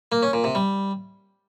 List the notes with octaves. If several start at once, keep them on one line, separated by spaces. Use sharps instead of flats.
A#3
C#4
A#2
C3
G3